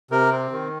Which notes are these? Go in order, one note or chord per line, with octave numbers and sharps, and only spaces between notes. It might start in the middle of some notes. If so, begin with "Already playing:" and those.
C3 A#4
C4
D#3